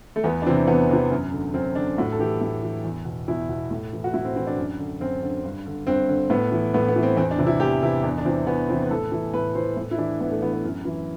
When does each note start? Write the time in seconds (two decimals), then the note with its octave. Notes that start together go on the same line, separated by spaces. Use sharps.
0.16 A3
0.24 E2 B3
0.42 D4
0.46 E3 C4
0.50 C3
0.67 E2 B3
0.89 C3 E3
1.11 F#2
1.32 D3
1.54 F#2 C4
1.75 D3 D4
1.98 A2 F#4
2.12 A4
2.19 E3 G4
2.41 A2
2.63 E3
2.84 E2
3.05 B2
3.28 E2 E4
3.49 B2
3.71 A2
3.93 E3
4.04 F#4
4.13 A2 E4
4.25 C4
4.36 E3 C4
4.47 D4
4.57 F#2
4.79 D3
5.01 F#2 C4
5.22 D3
5.43 G2
5.66 D3
5.87 G2 C4
6.09 D3
6.30 A2 B3
6.52 E3
6.74 A2 B3
6.88 B3
6.96 E3
7.03 C4
7.16 E2 C4
7.31 D4
7.38 C3 E3
7.47 E4
7.60 E2 G4
7.83 C3 E3 E4
8.03 E2 D4
8.18 D4
8.25 C3 E3 C4
8.46 E2 B3
8.69 C3 E3 C4
8.83 B4
8.91 A2 A4
9.12 E3
9.34 A2 B4
9.55 E3 C5
9.77 A2 B4
9.91 E4
9.98 E3 D4
10.20 A2 B3
10.31 A3
10.42 E3 B3
10.53 B3
10.64 F#2
10.85 E3